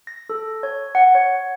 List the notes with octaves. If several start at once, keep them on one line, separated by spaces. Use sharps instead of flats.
A#6
A4
C#5
F#5
C#5